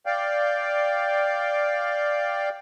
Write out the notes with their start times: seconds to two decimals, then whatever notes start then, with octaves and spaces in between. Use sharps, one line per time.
0.06 D5 F5 G5